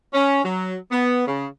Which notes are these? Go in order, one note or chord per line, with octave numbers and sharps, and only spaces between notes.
C#4
F#3
B3
C#3